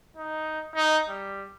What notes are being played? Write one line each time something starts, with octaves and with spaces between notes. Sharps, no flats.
D#4
D#4
G3